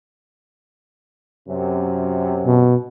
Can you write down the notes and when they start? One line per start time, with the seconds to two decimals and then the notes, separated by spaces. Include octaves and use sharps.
1.49 F#2 C3
2.46 B2